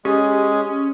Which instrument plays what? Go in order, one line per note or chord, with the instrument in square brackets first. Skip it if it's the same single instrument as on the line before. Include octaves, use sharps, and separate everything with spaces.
[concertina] G#3 [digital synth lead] C#4 [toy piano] G4 A4 D#5